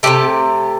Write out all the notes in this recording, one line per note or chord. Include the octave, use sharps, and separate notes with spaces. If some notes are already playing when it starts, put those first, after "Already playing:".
C3 F3 A3 G4 A4